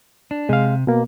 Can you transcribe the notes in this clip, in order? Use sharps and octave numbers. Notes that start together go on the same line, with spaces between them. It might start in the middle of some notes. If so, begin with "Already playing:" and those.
D4
C3 G#3 F5
B2 A#3